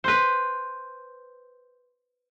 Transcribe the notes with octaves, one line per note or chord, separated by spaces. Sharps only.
B4 C5